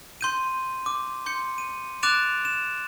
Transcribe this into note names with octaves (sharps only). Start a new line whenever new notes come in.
C6 G6 D#7
D6
C6 G6 C#7
D#7
D6 F#6 A6 D7 E7 F7
E7